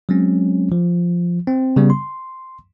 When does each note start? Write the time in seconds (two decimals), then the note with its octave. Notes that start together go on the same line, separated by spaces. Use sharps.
0.09 F#3 G#3 C4 C#4
0.72 F3
1.47 C4
1.76 C#3 G3 B3
1.90 C6